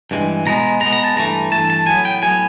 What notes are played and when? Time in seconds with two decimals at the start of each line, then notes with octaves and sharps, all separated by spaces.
0.11 G2 E3 G#3
0.46 B2 G#3 B3 A#5
0.81 B2 G#3 B3 A#5
0.93 A#5
1.04 A5
1.16 G2 E3 A3 A#5
1.52 G2 E3 A3 A5
1.70 A5
1.87 A2 F#3 B3 G#5
2.05 G5
2.22 A2 F#3 B3 G#5